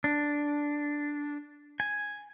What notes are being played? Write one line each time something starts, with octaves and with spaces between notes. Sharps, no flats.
D4
G#5